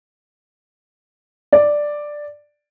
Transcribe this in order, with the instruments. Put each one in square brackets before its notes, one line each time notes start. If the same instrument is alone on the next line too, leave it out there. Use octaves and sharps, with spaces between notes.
[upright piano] D5